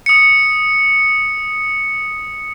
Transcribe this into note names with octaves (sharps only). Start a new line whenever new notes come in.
D#6 C#7